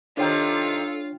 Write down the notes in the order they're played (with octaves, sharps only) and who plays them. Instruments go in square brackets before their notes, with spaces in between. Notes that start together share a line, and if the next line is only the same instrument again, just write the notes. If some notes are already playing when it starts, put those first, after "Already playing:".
[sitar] C3 D#3 D#4 [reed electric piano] D4 C#5 G5 [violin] F4 [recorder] A4